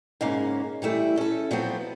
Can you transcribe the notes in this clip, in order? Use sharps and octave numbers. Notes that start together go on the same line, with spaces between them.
G#2 C#3 A#3 C#4
E3 G3 A3 E4
C#4 A4
F3 F#3 B3 C4